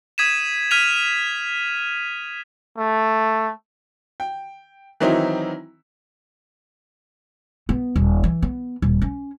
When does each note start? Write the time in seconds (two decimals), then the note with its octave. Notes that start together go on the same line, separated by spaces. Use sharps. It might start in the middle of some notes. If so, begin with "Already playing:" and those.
0.18 D#6 G#6 B6 D#7 E7
0.71 F6 G#6 B6 D#7 F7
2.78 A3
4.20 G5
5.00 D#3 E3 F#3 C4 D#4 E4
7.69 B3
7.96 D#1
8.24 E3
8.42 B3
8.82 D#1
9.02 C#4